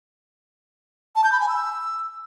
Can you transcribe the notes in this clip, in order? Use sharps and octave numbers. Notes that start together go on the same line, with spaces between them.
A5
G6
B5
G#5
E6